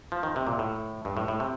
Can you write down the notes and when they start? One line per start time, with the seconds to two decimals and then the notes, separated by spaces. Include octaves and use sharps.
0.12 F3
0.23 D#3
0.36 C3
0.47 A#2
0.59 A2
1.05 G2
1.17 A2
1.28 A2
1.40 C3